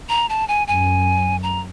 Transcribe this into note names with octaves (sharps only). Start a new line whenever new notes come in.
A#5
A5
G#5
F#2 G#5
A#5